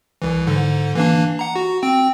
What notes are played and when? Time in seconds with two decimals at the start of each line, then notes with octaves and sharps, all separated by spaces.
0.22 C2 E3
0.47 G#2 D3
0.95 E3 A#3 D4
1.39 F#5 A#5
1.56 F#4
1.83 C4 G5